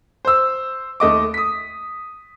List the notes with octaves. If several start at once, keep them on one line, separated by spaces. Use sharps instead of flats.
C5 E6
D#2 A3 D#5 D6
D#6 B6